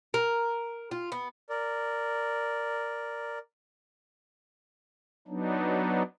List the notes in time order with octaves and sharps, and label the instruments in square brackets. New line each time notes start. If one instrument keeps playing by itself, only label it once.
[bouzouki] A#4
F4
B3
[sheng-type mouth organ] A#4 D5
[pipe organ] F#3 B3 D4 D#4